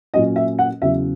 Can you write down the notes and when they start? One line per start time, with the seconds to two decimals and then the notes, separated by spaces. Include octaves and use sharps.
0.14 A#2 F#3 C#4 D#5
0.36 E5
0.59 F#5
0.82 E2 C#3 F#3 E5